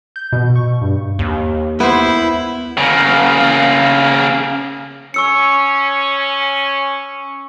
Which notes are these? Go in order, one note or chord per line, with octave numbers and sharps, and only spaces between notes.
G6
B2
C#6
G2
D#2
B3 E4 C5
C#3 A#3
C#4 C#6 E6 C#7